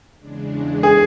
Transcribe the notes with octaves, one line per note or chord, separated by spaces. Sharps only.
E2 C#3 G#3 D4
G#4